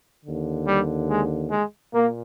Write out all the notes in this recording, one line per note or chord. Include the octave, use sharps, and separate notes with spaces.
D#2 D3
G3
G#3
G#3
A#2 A#3